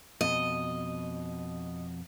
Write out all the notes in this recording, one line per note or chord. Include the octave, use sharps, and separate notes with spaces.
F2 B2 D#5